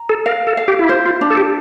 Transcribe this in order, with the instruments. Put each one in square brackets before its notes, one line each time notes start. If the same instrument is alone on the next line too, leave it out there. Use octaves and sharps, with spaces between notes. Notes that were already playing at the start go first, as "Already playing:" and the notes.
Already playing: [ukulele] A#5
[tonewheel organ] A4
[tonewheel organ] A#4 [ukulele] F5
[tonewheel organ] A4
[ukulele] F5
[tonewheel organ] G4
E4
[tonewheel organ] F4 [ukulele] C5
[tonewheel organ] F4
[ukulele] D4
[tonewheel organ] A4
G4